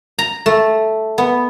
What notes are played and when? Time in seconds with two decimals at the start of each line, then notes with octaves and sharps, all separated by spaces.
0.19 A#5
0.46 A3
1.18 B3